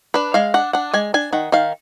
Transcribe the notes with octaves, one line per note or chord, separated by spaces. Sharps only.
D4 B4
G#3 F5
D4 F#5
D4 F#5
G#3 G#5
D4 G#5
D#3 F#5
D#3 F5